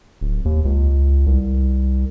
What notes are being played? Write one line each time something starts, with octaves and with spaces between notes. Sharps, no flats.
D1
D#2
C#2
C2